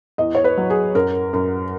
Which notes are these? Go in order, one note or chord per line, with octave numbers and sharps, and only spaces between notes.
E2 D#5
C#5
B4
F#3
G#4
F#2 A#4
F#2